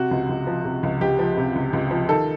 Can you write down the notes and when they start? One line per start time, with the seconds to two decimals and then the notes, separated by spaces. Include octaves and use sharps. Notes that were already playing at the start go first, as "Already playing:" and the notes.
Already playing: C3 F#4
0.11 C#2
0.29 C#2
0.47 F3
0.65 C3
0.83 C#2
1.01 C#2 G4
1.19 F3
1.37 C3
1.55 C#2
1.73 C#2
1.91 F3
2.09 D#3 A4